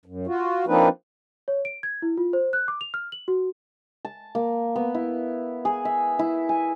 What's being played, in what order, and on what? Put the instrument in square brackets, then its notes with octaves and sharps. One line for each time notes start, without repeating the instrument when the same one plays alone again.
[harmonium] F#2
F4 F#4
F3 A#3 C4 D4 D#4 B4
[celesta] C#5
D7
G#6
E4
F4
C5
F#6
D6
F7
F6
F#7
F#4
[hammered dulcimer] A5
A#3
B3
E4
G#4
E5
E4
G#5